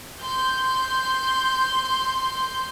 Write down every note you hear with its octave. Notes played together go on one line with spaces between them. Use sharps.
C6 G6